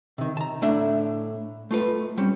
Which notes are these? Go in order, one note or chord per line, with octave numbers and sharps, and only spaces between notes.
C3 D#3
A5 A#5
A2 A3 D4 E5
A3 F4 B4
G3 C4 C#4